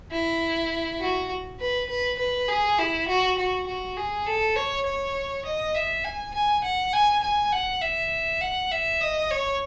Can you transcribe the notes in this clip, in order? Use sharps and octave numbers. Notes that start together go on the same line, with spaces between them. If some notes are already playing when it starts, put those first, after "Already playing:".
E4
F#4
B4
B4
B4
G#4
E4
F#4
F#4
F#4
G#4
A4
C#5
C#5
D#5
E5
G#5
G#5
F#5
G#5
G#5
F#5
E5
F#5
E5
D#5
C#5